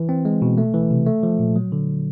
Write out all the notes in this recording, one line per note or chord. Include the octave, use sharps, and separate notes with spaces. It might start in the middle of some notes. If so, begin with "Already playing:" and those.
Already playing: E3
C4
G#3
B2
A3
E3
C3
A3
F3
A#2
F#3
D3